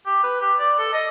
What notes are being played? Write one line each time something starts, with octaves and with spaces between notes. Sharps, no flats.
G4
B4
G4
D5
A4
D#5